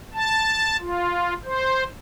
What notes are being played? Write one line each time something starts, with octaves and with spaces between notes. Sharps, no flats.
A5
F4
C5